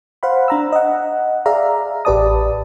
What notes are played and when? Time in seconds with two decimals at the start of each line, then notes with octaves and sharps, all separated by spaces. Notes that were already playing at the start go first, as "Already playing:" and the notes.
0.23 C5 F5 F#5 B5
0.48 D4 A#5 E6
0.72 D#5 F#5
1.46 G#4 D5 E5 F5 A#5
2.05 A1 G4 B4 D5 A5 D#6